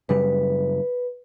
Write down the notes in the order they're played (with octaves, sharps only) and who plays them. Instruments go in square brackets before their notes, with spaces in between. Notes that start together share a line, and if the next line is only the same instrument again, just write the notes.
[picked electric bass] F#2 C#3 G3 [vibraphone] B4